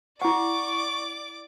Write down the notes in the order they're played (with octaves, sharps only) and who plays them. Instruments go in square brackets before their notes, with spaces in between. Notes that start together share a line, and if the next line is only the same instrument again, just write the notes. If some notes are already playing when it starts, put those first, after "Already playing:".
[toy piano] E4 F#5 [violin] D5 D6 [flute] C#6